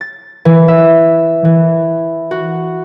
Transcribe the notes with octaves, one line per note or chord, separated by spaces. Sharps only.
A6
E3
E5
E3
F#4